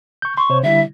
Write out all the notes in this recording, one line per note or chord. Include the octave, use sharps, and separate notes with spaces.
C#6 G6
C6 C#6
C3 C5 C#5
D3 G3 E4 E5